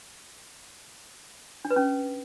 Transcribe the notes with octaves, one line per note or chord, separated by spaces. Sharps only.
D4
B4
C#4